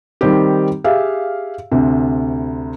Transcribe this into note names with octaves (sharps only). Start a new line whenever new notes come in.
D#3 G3 C4 G4
G4 G#4 E5 F5
D2 C3